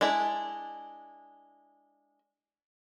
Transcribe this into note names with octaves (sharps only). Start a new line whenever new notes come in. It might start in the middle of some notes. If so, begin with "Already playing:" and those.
G#3 D4 E4